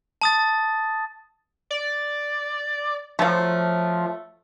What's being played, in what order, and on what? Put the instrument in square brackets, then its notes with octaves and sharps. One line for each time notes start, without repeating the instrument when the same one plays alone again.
[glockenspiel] A5 D#6 A6
[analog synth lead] D5
[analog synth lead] F3 [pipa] F#3 A3